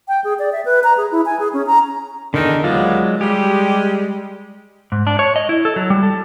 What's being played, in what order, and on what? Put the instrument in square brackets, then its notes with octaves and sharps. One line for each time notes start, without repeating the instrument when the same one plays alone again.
[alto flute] G5
G#4
D5
E5
B4
A#5
G#4
E4
G#5
G#4
C#4
A#5
[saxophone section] E2 D#3 A4 [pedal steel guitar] D3 D#4
[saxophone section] D#2 B3 F4 [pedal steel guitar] F#3 G#3 D5
[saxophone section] G3 G#3 [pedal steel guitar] G4
[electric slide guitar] G#2
D4
C#5
D#5
E4
A4
F#3
G3
A4